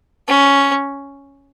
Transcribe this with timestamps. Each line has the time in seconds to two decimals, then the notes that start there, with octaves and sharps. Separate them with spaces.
0.28 C#4